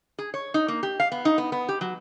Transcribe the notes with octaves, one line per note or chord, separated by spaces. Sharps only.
G#4
C#5
D#4
A#3
G4
F5
B3
D#4
B3
B3
G4
F#3